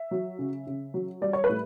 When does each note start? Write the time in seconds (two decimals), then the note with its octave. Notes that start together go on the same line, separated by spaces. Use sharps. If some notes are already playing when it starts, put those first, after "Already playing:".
Already playing: E5
0.11 F#3
0.39 C#3
0.67 C#3
0.94 F#3
1.21 G3 D5
1.33 C#5
1.44 B4
1.49 A2